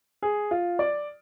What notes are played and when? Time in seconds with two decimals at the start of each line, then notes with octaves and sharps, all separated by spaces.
0.22 G#4
0.51 F4
0.79 D5